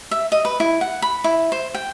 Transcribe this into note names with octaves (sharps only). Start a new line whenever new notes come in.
E5
D#5
B4
E4
F#5
B5
E4
C5
G5